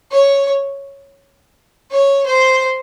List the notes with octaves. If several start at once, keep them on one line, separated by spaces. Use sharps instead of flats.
C#5
C#5
C5